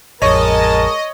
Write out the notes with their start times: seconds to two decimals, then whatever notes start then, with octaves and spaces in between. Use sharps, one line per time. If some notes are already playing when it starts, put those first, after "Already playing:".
0.22 A1 F2 G#3 A#4 C#5 D#5 A5